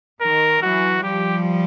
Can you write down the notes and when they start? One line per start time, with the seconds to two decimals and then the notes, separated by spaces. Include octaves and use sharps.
0.21 D#3 A#4
0.62 E3 F#3 F#4
1.03 F3 G3 G4